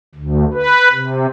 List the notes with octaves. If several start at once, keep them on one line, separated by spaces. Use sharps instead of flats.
D2
B4
C3